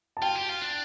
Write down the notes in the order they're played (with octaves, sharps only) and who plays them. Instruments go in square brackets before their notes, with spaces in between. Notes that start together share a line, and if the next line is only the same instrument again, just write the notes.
[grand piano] A5
[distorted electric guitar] F4 [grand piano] G5
[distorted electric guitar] G4
F4
D4